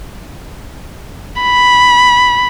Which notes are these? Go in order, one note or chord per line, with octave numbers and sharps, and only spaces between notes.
B5